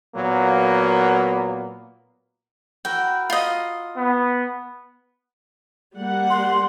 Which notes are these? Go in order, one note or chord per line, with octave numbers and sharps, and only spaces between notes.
A#2 F#3 A#3 B3
E4 F#4 A#4 G5
F4 D#5
B3
G3 A#3 F#5
C6